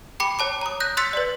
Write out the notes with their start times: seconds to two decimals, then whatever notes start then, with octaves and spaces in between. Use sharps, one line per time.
0.20 G5 B5 D6 C#7
0.39 C#5 A5 D6
0.61 A#5 D#6
0.80 F#6 G6 A#6
0.97 C6 E6 F#6 A6 B6 C#7
1.13 B4 D5